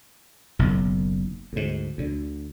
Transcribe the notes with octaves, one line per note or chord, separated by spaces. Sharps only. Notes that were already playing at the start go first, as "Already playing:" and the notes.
F#1 B1 F#2
D2 G#2
D2 D3